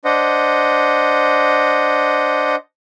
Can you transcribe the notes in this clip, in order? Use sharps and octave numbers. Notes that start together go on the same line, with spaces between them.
D4 C5 D#5 F#5